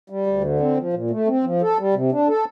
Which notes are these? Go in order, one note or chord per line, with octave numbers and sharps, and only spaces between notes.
G3
D2
D3
C4
F3
A#2
A3
C4
F3
A4
G3
C3
D4
A4